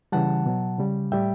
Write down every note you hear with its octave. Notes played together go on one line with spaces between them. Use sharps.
C#3 E3 G3 F#5 A5
B2 F#3
C#3 G3
A2 G3 E5 G5